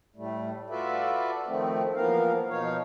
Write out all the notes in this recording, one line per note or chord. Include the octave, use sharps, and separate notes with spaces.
A2 G3 A3
F4 F#4 A4 B4 D5 E5
D#3 F3 A3 C4
E3 F3 A#3 B3 A#4 F5
B2 F3 D#4 C#5 F5